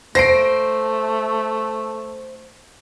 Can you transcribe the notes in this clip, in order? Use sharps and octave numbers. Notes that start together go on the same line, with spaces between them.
A3 C5 A#6 C7 D7